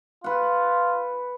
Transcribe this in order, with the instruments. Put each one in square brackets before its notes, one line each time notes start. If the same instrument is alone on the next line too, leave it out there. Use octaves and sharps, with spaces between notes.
[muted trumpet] F4 [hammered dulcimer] B4 F#5